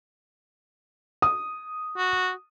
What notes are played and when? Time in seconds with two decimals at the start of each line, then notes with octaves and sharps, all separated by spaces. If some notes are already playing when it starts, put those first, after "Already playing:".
1.22 D#6
1.97 F#4